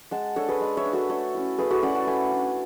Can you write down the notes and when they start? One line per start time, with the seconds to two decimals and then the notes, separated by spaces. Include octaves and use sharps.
0.11 G#3 F#5 A5
0.36 D4 A4 C#5
0.48 G#4 B4
0.61 G#3
0.77 C#5 E5
0.85 D4
0.93 F#4 A4
1.09 A3 A4 C#5
1.34 C#4 E4
1.58 A3 G#4 B4
1.70 F#4 A4
1.82 C#4 E4 D5 F#5
1.95 F#5 A5
2.07 A3 G#5 B5
2.32 D4